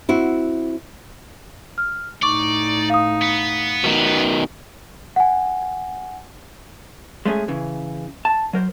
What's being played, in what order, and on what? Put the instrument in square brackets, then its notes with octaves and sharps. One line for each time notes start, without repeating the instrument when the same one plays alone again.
[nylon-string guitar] C4 E4 F#4
[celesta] F6
[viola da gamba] A2 D#4 [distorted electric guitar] D5 [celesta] C#6 D6
[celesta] F5 D#6
[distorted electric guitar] B3
[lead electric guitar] B2 D#3
[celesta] F#5 G#5
[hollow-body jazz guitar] G#3 A3 C#4 G#4
C#3 E3
A5
F#3 A#4 C5